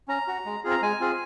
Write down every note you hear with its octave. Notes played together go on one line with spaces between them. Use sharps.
C#4 A#5
F#4
G#3
C4 F4 G#4
A#5
G#3 G#5
C4 F4 G#4